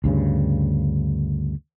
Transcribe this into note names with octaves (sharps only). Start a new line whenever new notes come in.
D2 G2 C#3